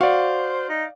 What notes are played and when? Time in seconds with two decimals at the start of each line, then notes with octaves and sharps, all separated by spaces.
0.01 F#4 C5 D5 F5
0.69 D#4